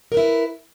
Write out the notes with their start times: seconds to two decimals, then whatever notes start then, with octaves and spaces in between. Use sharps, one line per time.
0.12 A#4
0.14 B4
0.17 E4